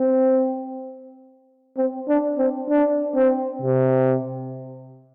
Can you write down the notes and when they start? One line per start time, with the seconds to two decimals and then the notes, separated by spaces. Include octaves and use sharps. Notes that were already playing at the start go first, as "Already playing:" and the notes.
Already playing: C4
1.77 C4
2.08 D4
2.38 C4
2.70 D4
3.15 C4
3.62 C3